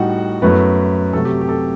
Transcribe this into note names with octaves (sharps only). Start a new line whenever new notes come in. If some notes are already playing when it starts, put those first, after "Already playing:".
Already playing: A2 G3 D#4 F#4 F#5
F#2 F#3 A3 B3 E4 B4
C3 F#3 A3 A4
G4
G4
A4